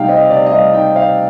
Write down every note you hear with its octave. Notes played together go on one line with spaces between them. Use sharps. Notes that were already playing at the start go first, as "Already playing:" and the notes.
Already playing: C3 G3 D#4 F5 G5
C4 D#5
C3 D5
D#5
G3 F5
D#4 G5
C4 F5